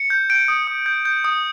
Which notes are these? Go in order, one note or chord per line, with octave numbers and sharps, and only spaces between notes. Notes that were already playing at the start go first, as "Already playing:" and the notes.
Already playing: C#7
G6
G6 D7
D#6
D#6
G6
G6
D#6